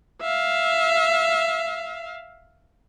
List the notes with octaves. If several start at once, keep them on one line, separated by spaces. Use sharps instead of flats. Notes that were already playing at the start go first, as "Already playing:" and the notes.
E5 F5